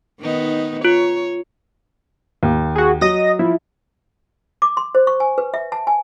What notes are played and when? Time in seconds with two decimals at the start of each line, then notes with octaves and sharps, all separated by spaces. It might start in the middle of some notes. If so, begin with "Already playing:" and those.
0.21 D#3 B3 D#4
0.85 F4 C#5
2.43 D#2
2.76 F#4 G#4
3.01 F#3 D#5 D#6 A#6
3.39 F3 E4
4.62 D6
4.77 C6
4.95 C5
5.07 C#6
5.20 G#5
5.38 B4
5.54 E5
5.72 A5
5.87 G#5